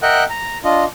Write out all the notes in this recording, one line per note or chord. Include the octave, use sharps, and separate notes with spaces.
A#4 D#5 E5 F#5 G5 F#6
A#5
D4 F4 D#5